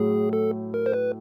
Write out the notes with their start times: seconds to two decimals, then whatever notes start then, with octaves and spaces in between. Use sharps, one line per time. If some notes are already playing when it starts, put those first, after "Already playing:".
Already playing: A2 F#3 A3 G#4
0.33 A4
0.74 A#4
0.86 C5
0.93 B4